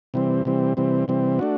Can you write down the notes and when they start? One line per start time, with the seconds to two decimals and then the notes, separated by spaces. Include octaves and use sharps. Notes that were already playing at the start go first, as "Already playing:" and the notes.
0.14 C3 E3 G3 C4
0.45 C3 E3 G3 C4
0.77 C3 E3 G3 C4
1.08 C3 E3 G3 C4
1.39 A3 D4 F#4